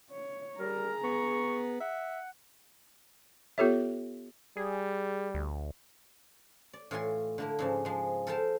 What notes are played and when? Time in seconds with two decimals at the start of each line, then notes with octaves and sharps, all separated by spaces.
0.11 C#5
0.59 G3 G#4 A#4 A#5
1.04 B3 C#6
1.81 E5 F#5
3.58 B3 F4 G4 A4 C#5 E5
4.57 G3 G#4
5.34 D2
6.73 D5
6.91 A2 E3 F4 F#4 G#5 C6
7.38 D3 A#3 E4
7.59 G#2 C#3 F3
7.85 F3 G#3
8.27 A4 A#4 C5 F5 G5 A5